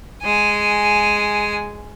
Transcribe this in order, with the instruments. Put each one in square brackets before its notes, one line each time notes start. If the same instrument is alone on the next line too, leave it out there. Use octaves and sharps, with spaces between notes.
[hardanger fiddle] G#3 G#5